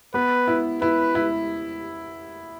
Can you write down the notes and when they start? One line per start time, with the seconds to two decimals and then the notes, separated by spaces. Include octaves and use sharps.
0.14 B3 B4
0.48 E4
0.81 E4 B4
1.15 E4